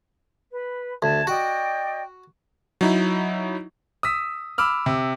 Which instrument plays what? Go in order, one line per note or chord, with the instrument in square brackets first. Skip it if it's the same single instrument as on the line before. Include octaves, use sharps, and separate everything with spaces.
[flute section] B4
[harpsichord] D2 [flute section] A4 A5 G#6
[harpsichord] F#4 [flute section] D5 D#5 G5
[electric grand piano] F#3 D#4 E4
[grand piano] D#6 E6 B6
B5 D6 E6 F6
C3